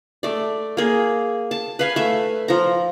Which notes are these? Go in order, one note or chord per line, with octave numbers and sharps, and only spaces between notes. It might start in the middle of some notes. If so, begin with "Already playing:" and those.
A3 D5
A#3 G#4
A5
B4 F5 G#5
A3 E5
F3 A#5